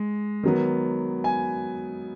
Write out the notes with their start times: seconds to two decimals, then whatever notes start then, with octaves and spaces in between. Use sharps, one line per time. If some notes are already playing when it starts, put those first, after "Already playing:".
Already playing: G#3
0.43 D#3 F#3 B3
1.24 G#5